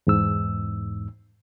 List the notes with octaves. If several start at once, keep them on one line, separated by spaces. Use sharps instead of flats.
E2 G#2 E6